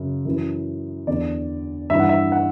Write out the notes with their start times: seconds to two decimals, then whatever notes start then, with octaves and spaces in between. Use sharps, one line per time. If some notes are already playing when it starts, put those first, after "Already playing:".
Already playing: F#2 C#3
0.25 F#2 E3
1.07 E2 D3 D5
1.90 G2 E3 E5
2.00 F#5
2.09 E5
2.32 F#5